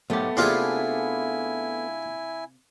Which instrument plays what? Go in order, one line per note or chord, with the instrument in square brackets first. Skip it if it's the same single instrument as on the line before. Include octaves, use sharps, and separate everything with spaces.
[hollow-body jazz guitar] B1 G#2 G4 [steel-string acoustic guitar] A3 B3
[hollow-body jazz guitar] C3 A#3 G4 [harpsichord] D4 F4 G#4 [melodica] E4 G#5